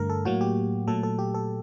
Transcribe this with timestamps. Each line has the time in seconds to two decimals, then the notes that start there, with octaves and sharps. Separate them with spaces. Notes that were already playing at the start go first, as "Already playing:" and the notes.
Already playing: G2 D3 A3 A#4
0.10 A4
0.25 A2 F#3 A#3 F#4
0.41 G4
0.88 A#2 F#3 A3 A4
1.03 A4
1.19 G4
1.34 A4